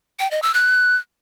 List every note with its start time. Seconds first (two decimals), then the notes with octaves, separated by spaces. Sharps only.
0.19 G5
0.31 D#5
0.42 E6
0.54 F#6